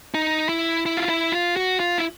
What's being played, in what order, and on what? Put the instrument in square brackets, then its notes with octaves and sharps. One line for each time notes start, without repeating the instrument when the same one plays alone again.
[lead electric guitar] D#4
E4
E4
F4
E4
F4
F#4
F4
E4